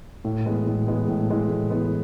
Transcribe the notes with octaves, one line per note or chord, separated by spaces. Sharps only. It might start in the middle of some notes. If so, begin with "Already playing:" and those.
A2
E3 G#3 B3
A2
E3 G#3 B3
A2
E3 G#3 B3
A2
E3 G#3 B3